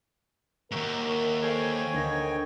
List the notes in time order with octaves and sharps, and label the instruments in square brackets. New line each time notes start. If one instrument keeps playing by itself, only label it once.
[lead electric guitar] D#2 G#2 [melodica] F#4 E5 A#5 [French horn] A#4
[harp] A4 C5 F5 [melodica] C#5 G5 G#5
[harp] D2 A#6 [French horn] D#3